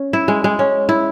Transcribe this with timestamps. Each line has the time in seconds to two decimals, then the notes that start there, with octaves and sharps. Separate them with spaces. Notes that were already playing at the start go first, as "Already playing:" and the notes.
Already playing: C#4
0.13 E4
0.28 G#3
0.44 G#3
0.59 C#4
0.89 E4